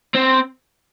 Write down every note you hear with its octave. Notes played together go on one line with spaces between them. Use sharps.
C4